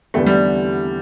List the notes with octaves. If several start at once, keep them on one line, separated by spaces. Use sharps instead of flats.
E2 D3 A3 B3 E4 G4
G3